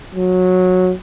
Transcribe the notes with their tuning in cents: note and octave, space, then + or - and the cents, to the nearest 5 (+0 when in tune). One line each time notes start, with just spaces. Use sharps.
F#3 -15